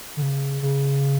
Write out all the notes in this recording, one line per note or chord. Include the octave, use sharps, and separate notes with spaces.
D3
C#3
C#3